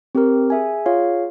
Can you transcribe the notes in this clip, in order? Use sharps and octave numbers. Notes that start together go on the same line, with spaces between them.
C4 G4 A#4
G#4 E5 G#5
F4 G#4 C#5 F5